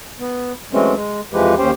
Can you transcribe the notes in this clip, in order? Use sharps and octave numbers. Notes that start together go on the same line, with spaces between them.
B3
E3 F#3 G#3 A3 C4 C#4
G#3
F2 E3 F3 G#3 G4 B4
D#2 C#4 G4 C5 G5